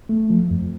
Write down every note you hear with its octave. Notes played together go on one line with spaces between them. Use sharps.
A3
F3
F2